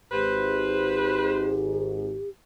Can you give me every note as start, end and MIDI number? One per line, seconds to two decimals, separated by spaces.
0.12 2.18 32
0.12 2.18 44
0.12 2.29 67
0.12 1.59 71
0.12 1.59 72